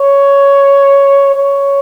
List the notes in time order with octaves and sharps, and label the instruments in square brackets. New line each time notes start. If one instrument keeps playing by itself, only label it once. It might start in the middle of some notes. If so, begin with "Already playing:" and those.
Already playing: [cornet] C#5
C#5